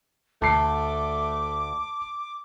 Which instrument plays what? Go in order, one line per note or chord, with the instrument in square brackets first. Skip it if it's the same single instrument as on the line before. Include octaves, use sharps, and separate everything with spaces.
[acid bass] D2 [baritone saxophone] A3 [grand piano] A5 C7 [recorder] D6